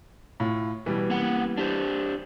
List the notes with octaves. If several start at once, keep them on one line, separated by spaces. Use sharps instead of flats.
A2 F4
G#2 B2 E3 G3
A#3 B3 F#5
D4 G4 C5